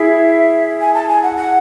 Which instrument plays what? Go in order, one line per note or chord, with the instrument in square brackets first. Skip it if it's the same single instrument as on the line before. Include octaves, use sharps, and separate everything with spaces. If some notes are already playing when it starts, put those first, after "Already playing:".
Already playing: [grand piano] E4 G#4 [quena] E5
[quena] G#5
A5
G#5
F#5
F#5